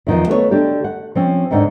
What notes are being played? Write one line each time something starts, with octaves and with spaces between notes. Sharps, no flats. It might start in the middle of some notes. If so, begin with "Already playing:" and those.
E2 D#3 F3
A3 B3 A4 C#5
D3 D4 G4
F#5
F3 C4 C#4
D#2 G#2 D3 D#4